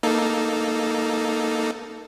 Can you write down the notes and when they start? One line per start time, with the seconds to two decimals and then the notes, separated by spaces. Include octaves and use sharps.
0.03 A#3 D#4 A4